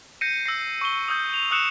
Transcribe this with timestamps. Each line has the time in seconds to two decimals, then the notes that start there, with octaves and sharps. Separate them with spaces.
0.21 G6 A#6 C7 C#7 D#7
0.46 E6 A#6 C7
0.81 C#6 G7
1.08 D#6 E6 G6
1.34 F7
1.51 D#6 E6 F#6 C#7 E7